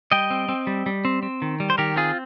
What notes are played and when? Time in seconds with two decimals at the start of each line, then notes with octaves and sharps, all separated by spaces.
0.12 G3 D#5 G5
0.30 C4
0.49 C4
0.67 G3
0.86 G3
1.05 C4
1.23 C4
1.42 D#3
1.60 G3
1.70 C5
1.78 D#3 G4 A#4
1.96 C4 F4 G#4